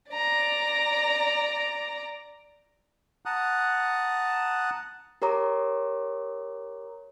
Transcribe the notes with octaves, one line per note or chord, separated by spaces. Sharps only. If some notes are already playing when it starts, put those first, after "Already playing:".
D5 A#5
F#5 A5 A#5 D#6 F#6
G4 A#4 C#5 A#5 D6